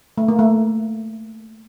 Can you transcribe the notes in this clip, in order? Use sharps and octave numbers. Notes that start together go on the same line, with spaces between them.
A3
A#3
A3